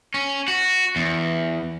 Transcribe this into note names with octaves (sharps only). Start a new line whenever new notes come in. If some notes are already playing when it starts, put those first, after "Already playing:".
C#4
F#4
E2